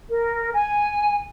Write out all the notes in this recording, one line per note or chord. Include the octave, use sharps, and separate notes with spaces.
A#4
G#5